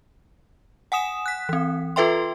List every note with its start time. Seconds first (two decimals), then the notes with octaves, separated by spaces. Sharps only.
0.92 F#5 G#5 D#6 E7
1.26 F#6 B6
1.49 E3 C4
1.96 F4 A4 B4 E5 G5 C6